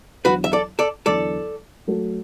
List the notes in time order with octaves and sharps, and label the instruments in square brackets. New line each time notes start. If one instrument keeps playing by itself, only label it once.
[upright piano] E2 D3 F#3 [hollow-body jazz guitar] F#4 B4
[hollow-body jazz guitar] E5
A4 D5
A4 D5
[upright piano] E2 D3 F#3 [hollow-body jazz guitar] A4 D5
[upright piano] F#3 A3 F#4 A4